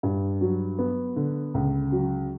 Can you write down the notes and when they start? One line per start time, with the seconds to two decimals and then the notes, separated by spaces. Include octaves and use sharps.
0.03 G2
0.41 F#3
0.79 B3
1.16 D3
1.54 C#2
1.92 F#3